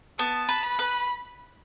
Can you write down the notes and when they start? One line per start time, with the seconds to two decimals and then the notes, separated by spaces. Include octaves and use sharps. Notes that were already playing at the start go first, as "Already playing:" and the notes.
0.19 B3 A5
0.49 B4
0.64 B5
0.79 B4